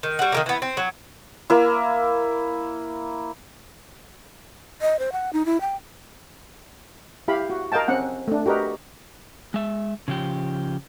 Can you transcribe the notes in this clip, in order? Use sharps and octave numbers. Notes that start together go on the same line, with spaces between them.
D#3
G3 F#4
D#3 G3 A#3
E3 B3
C4
F#3
A#3 E4
D#5
C5
F#5
D#4
E4
G5
E4 G4 F5 B5
F#4
A#4 D#5 F5 G5 A5
C4 C#4 F#5
A3 D4
F#4 G4 A#4 B4 D#5
G#3 E5
C#3 F3 G4